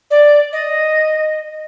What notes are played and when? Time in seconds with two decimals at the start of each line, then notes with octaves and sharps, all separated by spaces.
0.11 D5
0.53 D#5